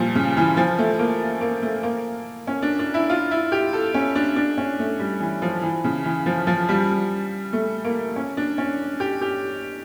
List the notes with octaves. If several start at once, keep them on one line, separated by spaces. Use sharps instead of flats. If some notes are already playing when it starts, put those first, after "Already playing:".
Already playing: A#2 F3 G3
C#3
E3
F3
A3
A#3
A#3
A3
A#3
C#4
D4
D4
E4
F4
E4
G4
A4
C#4
D4
D4
C#4
A3
G3
E3
F3
E3
C#3
E3
F3
F3
G3
A3
A#3
C#4
D4
C#4
G4
G4